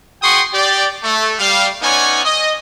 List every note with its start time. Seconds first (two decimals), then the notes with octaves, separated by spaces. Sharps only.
0.23 F#4 G#4 G5 C6 C#6 D#6
0.53 G4 D5
1.04 A3
1.39 G3 F5
1.82 B3 C#4 D#4 C#5 D5 G#5
2.25 D#5